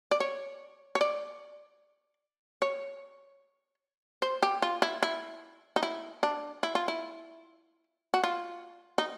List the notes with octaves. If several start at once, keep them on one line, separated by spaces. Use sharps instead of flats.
D5
C#5
C#5
D5
C#5
C5
G4
F4
E4
E4
D#4
E4
D4
E4
F4
E4
F#4
F4
D#4